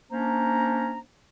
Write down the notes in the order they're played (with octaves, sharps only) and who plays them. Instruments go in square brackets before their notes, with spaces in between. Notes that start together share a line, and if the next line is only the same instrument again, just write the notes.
[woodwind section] A#3 C#4 D4 C5 A#5